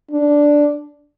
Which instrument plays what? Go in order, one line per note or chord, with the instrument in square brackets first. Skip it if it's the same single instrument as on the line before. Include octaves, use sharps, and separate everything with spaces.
[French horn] D4